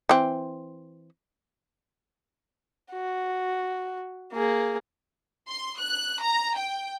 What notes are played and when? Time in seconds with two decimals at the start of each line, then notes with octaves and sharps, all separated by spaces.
0.09 E3 C4
2.92 F#4
4.33 A#3 G#4
5.49 C6
5.79 F#6
6.21 A#5
6.56 G5